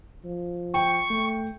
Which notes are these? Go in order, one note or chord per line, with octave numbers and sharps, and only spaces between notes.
F3
G5 C#6
A3